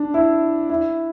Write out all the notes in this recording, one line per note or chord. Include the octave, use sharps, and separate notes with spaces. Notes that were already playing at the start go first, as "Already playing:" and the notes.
Already playing: D4
E4
E4